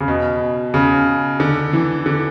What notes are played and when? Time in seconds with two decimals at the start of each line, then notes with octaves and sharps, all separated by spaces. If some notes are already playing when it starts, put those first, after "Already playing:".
0.01 C#3
0.08 B2
0.74 C#3
1.40 D3
1.73 E3
2.06 D3